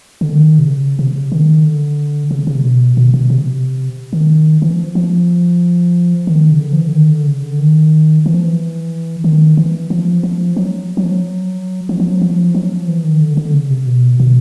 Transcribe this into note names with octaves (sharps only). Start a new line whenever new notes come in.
D3
D#3
C3
C#3
C3
C#3
D#3
D3
C#3
C#3
C3
B2
B2
B2
C3
D#3
E3
F3
F3
D#3
C#3
D3
F3
E3
D3
D#3
D3
C#3
D3
D#3
E3
F3
E3
D#3
E3
F3
F3
F#3
F#3
F3
F#3
F3
F3
F#3
F3
F#3
F3
E3
D#3
D3
D3
C#3
C3
B2
B2